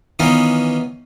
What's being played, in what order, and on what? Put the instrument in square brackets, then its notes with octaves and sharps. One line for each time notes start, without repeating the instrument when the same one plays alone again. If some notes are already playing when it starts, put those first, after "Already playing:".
[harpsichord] D#3 E3 B3 C#4 D#4 F4